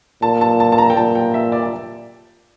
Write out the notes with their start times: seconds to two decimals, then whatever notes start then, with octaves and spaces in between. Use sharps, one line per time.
0.22 A#2 A5
0.41 A5
0.60 A5
0.72 A5
0.78 A#5
0.90 G5
0.97 A#2 A5
1.15 G5
1.34 E5
1.52 D5
1.63 D5